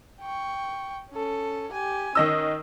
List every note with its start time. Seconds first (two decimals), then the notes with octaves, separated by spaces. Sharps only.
0.21 G5 C#6
1.11 C#4 A4
1.72 G4 G#5
2.15 D#3 C#4 D#5 E6